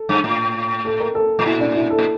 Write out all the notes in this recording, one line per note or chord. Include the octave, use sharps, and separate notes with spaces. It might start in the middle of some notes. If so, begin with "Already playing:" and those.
Already playing: A4
G2
A2
A4
A#4
A4
A2
A#2 E4
D4
E4
A4
A#2